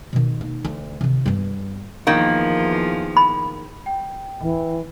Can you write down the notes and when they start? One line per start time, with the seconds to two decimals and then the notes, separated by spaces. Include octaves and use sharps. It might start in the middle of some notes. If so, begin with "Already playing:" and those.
0.13 B2 D#3
0.41 A#3 D#4
0.65 D2
1.01 C3 D#3
1.26 G2 B3
2.07 E2 D#3 F3 A#3
3.17 B5
3.86 G5
4.41 D1 E3